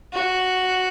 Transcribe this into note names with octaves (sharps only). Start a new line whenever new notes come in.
F#4